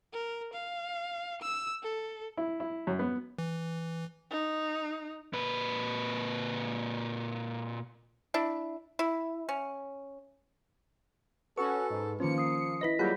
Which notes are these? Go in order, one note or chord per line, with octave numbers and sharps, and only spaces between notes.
A#4
F5
E6
A4
E4
E4
F#2
B3
E3
D#4
A#2 B4
D4 E4
E4
C#4
C#4 F#4 A4 B4 C#6
G#2
D#3 F3 A#3 C#4 C#7
D#6 C7
E4 B4 D#5 A#6 B6
F#3 G3 A#3 F4 G#4 F#5 B5 G6